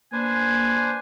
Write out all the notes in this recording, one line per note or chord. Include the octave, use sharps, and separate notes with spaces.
A#3 D4 B4 C5 G#5